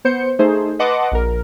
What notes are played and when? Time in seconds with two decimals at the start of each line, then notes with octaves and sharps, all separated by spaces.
0.05 B3 C5 G6 C#7
0.39 A3 D#4 G#4 C5
0.79 B4 D#5 F#5 A5 C6 D6
1.12 A#1 A#4